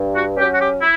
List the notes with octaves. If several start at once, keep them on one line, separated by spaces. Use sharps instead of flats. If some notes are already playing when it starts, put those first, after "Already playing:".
Already playing: G2
F#4
F#3 C#4 G4
F#4
G4
E4